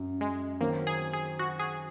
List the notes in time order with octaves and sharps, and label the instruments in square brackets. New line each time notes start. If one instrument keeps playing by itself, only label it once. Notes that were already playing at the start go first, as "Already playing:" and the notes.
Already playing: [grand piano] F#2
[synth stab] G#3
[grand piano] D#3 F#3 C4 [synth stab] A#3
[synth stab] G#4
G#4
F#4
G#4